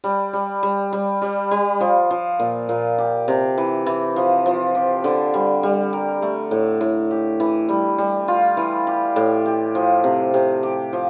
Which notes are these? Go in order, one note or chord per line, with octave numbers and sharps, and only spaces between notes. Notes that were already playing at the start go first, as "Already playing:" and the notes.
G3
G3
G3
G3
G3
G3
F3
F3
A#2
A#2
G4
C3
E3
E3
F3
F3
G4
D3
G3
G3
A#4
A3
A2
A2
G4
E3
G3
G3
F4
E3
G4
A2
G4
F3
C3
C3
G4
F3